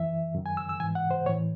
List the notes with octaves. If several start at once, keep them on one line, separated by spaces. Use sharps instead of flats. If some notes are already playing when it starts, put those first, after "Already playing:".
Already playing: F#2 E3 E5
F#2 D#3
G#5
E6
E6
G#2 E3 G#5
F#5
C5
A2 E3 C#5